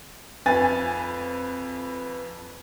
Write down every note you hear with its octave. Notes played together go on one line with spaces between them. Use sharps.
F2 B4 G#5 A6